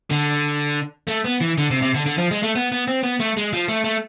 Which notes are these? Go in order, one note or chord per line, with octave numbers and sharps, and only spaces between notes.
D3
A3
B3
E3
D3
C3
C3
D3
D3
F3
G#3
A3
B3
B3
C4
B3
A3
G#3
F3
A3
A3